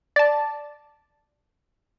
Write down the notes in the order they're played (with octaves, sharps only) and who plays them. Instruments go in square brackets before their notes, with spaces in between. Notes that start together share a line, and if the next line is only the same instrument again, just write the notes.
[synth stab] D5 A5